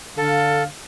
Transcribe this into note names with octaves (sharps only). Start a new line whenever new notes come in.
D3 A4 F5